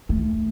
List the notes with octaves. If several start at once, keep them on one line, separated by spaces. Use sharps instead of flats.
A3